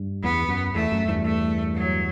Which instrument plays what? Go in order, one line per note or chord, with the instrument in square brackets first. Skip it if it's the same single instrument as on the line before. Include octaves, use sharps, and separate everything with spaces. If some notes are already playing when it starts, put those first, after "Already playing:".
Already playing: [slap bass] G2
[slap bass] E2 [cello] B3
[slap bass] F#2
[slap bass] E2 [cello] A3
[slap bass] F#2
E2 G2
[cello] A3
F#3